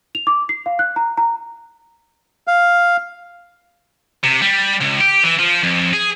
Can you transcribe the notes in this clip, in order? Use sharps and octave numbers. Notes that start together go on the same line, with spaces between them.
F7
D6
C7
F5
F#6
A#5
A#5
F5
C3
G3
C#2
G4
E3
F3
F2
G#4